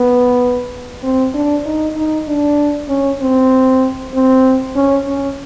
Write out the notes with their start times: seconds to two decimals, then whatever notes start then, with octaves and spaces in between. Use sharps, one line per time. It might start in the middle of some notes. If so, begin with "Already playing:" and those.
Already playing: B3
1.03 C4
1.34 D4
1.66 D#4
1.96 D#4
2.28 D4
2.89 C#4
3.21 C4
4.14 C4
4.76 C#4
5.07 C#4